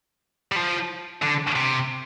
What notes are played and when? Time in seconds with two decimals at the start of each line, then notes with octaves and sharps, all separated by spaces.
0.52 G3
0.56 F3
1.22 D3
1.56 C3